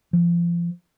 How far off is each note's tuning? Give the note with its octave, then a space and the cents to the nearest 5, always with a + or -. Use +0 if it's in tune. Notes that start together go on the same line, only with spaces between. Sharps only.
F3 -30